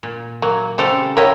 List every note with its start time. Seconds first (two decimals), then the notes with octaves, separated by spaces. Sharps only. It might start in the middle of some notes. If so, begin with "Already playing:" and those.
0.03 A#2
0.42 F#3 A#3
0.78 C#3 G3 C4 A4 F5
1.17 E4 A#4 C#5 D#5 G5